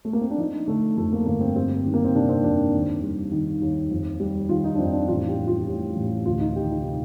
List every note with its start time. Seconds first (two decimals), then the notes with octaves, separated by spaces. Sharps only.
0.05 A3
0.13 A#3
0.21 C4
0.30 D4
0.38 F3 D#4
0.67 D3 A3
0.97 F2 A3
1.13 A#3
1.26 G1 A#3
1.41 C4
1.55 G3 C4
1.86 D#3
1.94 A#3
2.05 C4
2.14 C3 D4
2.29 C4
2.44 F2 D4
2.74 D#2
3.02 G3
3.32 D#3
3.62 D#2
3.91 F2
4.20 G3
4.49 D#3 F4
4.64 D#4
4.75 D4
4.79 F2 C4
4.93 D4
5.08 A1 F4
5.28 G4
5.37 G3
5.47 F4
5.67 A2 G4
5.96 A1
6.25 D2 F4
6.40 D#4
6.56 D#3 G4
6.70 D#4
6.84 C3